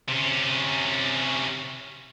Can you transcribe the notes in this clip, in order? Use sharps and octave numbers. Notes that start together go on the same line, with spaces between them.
C3 C#4